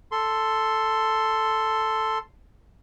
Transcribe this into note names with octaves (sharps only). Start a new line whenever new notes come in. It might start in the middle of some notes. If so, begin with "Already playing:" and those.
A4 C6